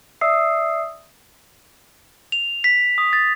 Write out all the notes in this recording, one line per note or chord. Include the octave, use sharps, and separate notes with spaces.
D5 E5 D#6 E6 C7
F7
B6
D#6
A6